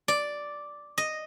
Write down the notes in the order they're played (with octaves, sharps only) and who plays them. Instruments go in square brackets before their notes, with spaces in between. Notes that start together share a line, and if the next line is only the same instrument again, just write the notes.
[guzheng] D5
D#5